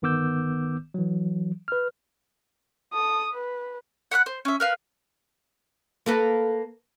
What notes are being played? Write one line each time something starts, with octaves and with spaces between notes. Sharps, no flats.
G1 D#3 B3 D6 E6 G6
E3 F#3
B4 F6
A4 D#6
B4
F#5 B5 F6 F#6
C5
C#4 E5
A#4 B4 F5
A#3 A4 B4